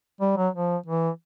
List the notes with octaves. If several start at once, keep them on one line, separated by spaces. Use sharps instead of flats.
G3
F#3
F3
E3